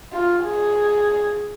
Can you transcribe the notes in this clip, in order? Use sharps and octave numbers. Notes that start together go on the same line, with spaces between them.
F4
G#4